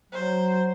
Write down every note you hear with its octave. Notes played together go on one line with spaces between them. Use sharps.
F#3 C5